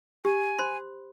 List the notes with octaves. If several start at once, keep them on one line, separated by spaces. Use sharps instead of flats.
G4 G#5
C5 B5 C6